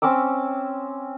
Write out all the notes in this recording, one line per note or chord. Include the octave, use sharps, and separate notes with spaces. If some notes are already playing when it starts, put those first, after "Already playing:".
C4 C#4 D6 E6